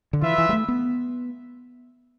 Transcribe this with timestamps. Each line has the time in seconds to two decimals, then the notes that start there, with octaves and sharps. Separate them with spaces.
0.13 D3
0.22 E3 F4 B4 E5
0.38 E3
0.49 G3
0.53 A3
0.68 B3